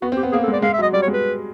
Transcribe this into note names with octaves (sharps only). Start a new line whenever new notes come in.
B3 F#4
C4
G4
B3
A#3 G#4
A4
G#3
D5
G#3 F5
E5
F#3
D#5
G3 D5
C#5
G#3
B4